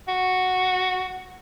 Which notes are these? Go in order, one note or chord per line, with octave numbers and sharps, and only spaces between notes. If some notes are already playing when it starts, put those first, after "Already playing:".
F#4